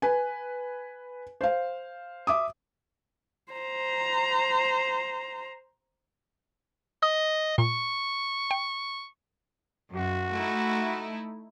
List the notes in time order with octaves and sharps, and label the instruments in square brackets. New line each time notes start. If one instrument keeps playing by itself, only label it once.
[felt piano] B4 G#5
C5 F5
E5 D6 D#6
[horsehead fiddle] C5 A#5
[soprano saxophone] D#5 [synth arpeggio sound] D#6
[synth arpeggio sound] A#2 [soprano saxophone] C#6
[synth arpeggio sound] G5
[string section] F#2 [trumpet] F#4
[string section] A3 D#4 E4